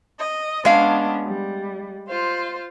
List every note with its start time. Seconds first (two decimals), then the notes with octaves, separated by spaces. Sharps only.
0.20 D#5
0.65 G#3 B3 C#4 D4 F5
1.25 G3
2.09 F4 C5